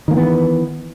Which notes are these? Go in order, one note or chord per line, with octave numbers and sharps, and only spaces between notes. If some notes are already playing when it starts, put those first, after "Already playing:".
D#3 E3 A#3 B3